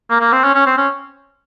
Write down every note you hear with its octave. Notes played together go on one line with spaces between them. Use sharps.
A#3
A#3
C4
C#4
C#4
C4
C#4